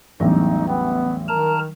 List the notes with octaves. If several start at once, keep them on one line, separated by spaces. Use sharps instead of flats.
A1 E2 F#3 G3 D4 D#4
B3 G5 B5
D#3 A#4 A5 A#5